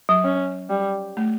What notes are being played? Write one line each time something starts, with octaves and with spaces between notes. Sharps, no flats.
F#3
C#4
G3
A3